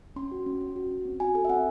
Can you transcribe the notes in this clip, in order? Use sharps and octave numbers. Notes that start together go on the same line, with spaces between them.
C#4 C6
F#4
C#4
C#4
F#4
C#4
C4
F#4 G#5
A4 G#5
E5
C4 F#5